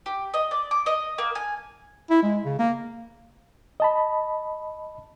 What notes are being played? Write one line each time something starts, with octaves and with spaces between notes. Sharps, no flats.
G4
D#5
D5
D6
D#5
A#3
G#5
E4
G#3
C#3
A#3
D#5 A5 B5